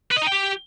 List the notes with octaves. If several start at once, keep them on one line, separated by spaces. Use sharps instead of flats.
B4
D#5
D#4
G5
G4